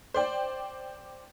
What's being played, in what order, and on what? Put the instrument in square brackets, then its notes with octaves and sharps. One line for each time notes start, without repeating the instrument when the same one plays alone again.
[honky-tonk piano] C5 D5 G5